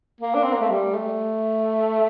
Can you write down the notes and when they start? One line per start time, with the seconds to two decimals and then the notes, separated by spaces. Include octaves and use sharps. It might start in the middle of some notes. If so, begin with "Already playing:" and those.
0.21 A#3
0.35 D4
0.44 C4
0.52 A#3
0.61 A3
0.70 G3
0.95 A3